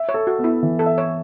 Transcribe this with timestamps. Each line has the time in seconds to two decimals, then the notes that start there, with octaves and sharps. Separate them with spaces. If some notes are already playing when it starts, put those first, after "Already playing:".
Already playing: E5
0.09 C#5
0.14 A4
0.27 F#4
0.39 B3
0.44 E4
0.63 E3
0.79 A4
0.86 E5
0.98 C#5